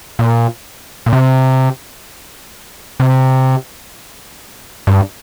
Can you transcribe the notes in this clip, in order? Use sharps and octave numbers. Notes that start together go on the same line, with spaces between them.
A#2
A#2
C3
C3
G2